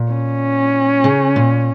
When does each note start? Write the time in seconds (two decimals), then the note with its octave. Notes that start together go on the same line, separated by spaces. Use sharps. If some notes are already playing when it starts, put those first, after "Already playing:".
Already playing: A#2
0.11 C#4
1.04 C#3
1.36 A#2